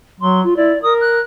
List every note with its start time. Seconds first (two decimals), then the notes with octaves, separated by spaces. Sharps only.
0.21 F#3 C6
0.43 F4
0.56 E4 D5
0.82 A#4 D#6
1.00 F#6